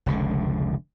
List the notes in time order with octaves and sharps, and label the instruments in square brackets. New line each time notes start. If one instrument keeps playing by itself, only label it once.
[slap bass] F1 C#2 D3